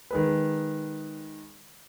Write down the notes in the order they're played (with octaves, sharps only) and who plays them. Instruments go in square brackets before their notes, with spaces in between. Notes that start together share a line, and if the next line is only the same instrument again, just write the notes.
[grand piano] D#3 G#3 B4